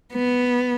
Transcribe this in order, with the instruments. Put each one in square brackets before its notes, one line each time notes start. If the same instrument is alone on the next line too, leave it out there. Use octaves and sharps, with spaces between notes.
[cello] B3